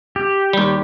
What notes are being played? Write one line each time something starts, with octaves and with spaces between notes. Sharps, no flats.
G4
D#2 G3